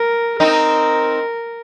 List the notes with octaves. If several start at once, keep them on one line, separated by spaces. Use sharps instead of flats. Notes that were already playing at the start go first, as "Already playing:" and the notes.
Already playing: A#4
C4 D#4 A#4